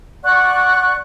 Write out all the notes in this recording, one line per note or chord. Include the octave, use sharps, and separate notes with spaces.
D5 F#5 C#6 F#6